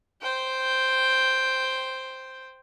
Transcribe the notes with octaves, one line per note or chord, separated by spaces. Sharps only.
C5 G5